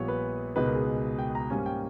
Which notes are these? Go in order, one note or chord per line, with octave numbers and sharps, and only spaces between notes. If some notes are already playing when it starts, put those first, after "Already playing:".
Already playing: A#1 A#2 G3 B3 C#5
B4
C#2 B2 G#3 D#4 B4
A#4
G#4
A#4
G5
A#5
G#2 G3 A#3 C#4 G#5
G5